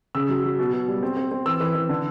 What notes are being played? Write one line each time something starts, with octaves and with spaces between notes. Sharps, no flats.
C#3 E6
F#3
F#3
B2
B2
G3
C4
C4
C4
E3 E6
E3
E3
D3